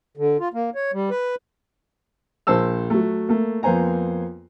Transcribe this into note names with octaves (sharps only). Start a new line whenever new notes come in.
D3
F4
A#3
C#5
G3
B4
A#1 A#4 C5 A5 E6
F#3 A3
A3 A#3
F2 A#3 B3 C5 G#5 A#5